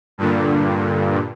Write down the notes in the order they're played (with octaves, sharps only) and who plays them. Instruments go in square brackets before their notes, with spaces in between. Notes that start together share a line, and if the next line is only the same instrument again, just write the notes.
[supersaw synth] G2 A#2 D3